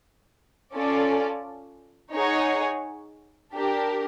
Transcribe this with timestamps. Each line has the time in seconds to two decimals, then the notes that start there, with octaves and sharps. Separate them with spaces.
0.74 C#4 F4 A4 D5
2.14 D#4 G#4 C#5 F#5
3.54 D4 G4 A#4